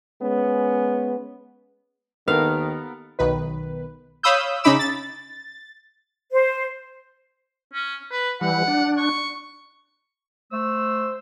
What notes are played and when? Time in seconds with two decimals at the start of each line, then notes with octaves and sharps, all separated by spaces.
0.22 G#3 B3 C#4
2.28 D#2 D#3 B3 A4 A#4 F5
3.19 B1 D#3 B4
4.23 C#5 F5 B5 D#6 E6 G6
4.64 C#3 C#4 D#4 B5 D6 E6
4.79 A6
6.32 C5
7.73 C#4
8.11 B4
8.41 E3 G3 F#5
8.68 D4
8.97 C#6
10.52 A3 C5 E6